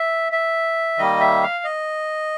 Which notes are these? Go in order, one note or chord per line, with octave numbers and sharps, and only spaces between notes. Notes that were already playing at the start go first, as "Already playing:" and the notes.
Already playing: E5
E5
D#3 G3 A#3 D#5
E5
F5
D#5